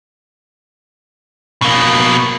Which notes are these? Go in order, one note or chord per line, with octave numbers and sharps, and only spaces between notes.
B2 A#3